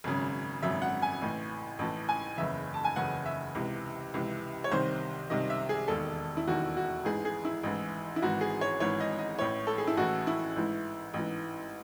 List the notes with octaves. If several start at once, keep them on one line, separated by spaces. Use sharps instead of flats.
G#1 F#2 C#3
G#1 F#2 C#3 E5
F#5
G#5
A1 A2 E3
A1 A2 E3 A5
G#5
F#1 E2 C#3 E5
A5
G#5
F#1 E2 C#3 F#5
E5
C#2 C3 E3
C#2 C3 E3
C#5
C2 C3 D#3 C5
C2 C3 D#3 D#5
E5
G#4
E1 D#2 D#3 A4
E4
E1 D#2 D#3 F#4
F#4
A1 G#2 E3 G#4
G#4
E4
A1 G#2 E3
E4
G#1 G#2 E3 F#4
G#4
C#5
G#1 G#2 E3 C#5
D#5
D#5
A1 A2 E3 C#5
A4
G#4
E4
A1 A2 E3 F#4
E4
A1 G#2 E3
A1 G#2 E3